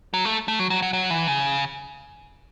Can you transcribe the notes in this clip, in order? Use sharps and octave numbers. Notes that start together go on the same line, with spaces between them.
F#3
A3
A3
F#3
F#3
F#3
F#3
E3
C#3